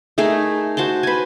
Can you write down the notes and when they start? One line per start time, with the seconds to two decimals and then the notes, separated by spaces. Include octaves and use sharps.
0.18 A3 D#4 G#4 A#4
0.77 F#4 C5 A5 C6
1.03 B4 G#5